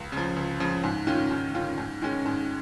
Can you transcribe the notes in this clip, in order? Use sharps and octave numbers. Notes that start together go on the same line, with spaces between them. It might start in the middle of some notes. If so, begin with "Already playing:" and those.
Already playing: C#2
C#3
F3
C#2
C#3 F3
G#2
D#3 C#4 F4
G#2
D#3 C#4 F4
G#2
D#3 G#3 C#4
G#2